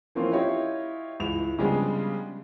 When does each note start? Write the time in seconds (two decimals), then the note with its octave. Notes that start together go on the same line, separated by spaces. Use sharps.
0.15 E3 F3 A#3 C4 C#4 F4
0.31 E4 F4 G4 C#5 D#5
1.20 C#2 E3 F7
1.58 C#3 F3 G3 G#3 B3 D4